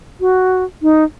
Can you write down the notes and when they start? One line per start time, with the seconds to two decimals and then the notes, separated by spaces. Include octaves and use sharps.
0.21 F#4
0.82 D#4